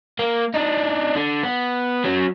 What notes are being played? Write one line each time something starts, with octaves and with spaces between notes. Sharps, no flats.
A#3
D4 D#4
D3
B3
F#3 C#4